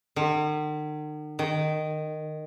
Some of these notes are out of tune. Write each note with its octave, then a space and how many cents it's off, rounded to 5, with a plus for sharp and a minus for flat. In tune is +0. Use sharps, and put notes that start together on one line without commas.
D#3 -45
D#3 -10